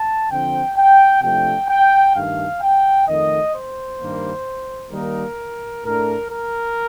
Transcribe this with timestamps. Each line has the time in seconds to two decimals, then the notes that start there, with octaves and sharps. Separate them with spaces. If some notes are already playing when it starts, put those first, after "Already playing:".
Already playing: A5
0.30 D3 F3 C4 G5
0.76 G5
1.22 C3 F3 A3 D4 G5
1.69 G5
2.15 G2 D#3 A3 F5
2.61 G5
3.07 F2 D#3 A3 D#5
3.53 C5
3.99 G2 D#3 G3 A#3
4.92 D#3 G3 A#3 D#4 A#4
5.84 A2 A3 D4 A#4
6.30 A#4